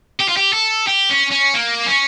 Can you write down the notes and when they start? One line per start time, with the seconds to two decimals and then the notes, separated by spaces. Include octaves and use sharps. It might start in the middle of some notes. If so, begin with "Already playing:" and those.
0.20 G4
0.29 F4
0.37 G4
0.53 A4
0.87 G4
1.09 C#4
1.31 C#4
1.54 A#3
1.86 C#4